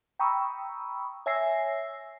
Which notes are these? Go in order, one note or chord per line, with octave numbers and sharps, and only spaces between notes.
G5 A#5 B5 C#6 D#6 E6
C#5 E5 G#5 E6 A#6 C7